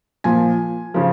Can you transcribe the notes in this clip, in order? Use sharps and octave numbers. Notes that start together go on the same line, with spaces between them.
A#2 F3 G#5
C#3 F3